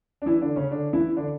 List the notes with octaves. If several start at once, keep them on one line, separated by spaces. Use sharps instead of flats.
D4
E3 E4
D3 D4
C#3 C#4
D3 D4
E3 E4
D3 D4